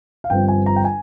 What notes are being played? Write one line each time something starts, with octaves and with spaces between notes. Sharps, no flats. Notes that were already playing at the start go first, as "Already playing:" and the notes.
F5
G1 G2 F3 C4 G5
G#5
A#5
G5
G#5